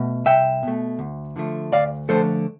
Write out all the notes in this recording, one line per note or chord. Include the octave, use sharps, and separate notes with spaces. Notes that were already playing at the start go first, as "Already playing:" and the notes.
Already playing: B2 A3
C2 E5 G5
B2 A3
D2
D3 F3 A3
D2 D5 F5
D3 F3 A3 A4 C5